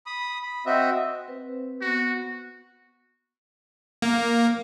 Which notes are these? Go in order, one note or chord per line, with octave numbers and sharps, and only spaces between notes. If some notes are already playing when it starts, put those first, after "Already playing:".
B5 D#6
B5
C4 F#4 D#5 E5
C4 B4 C5
B3 F#4
A#3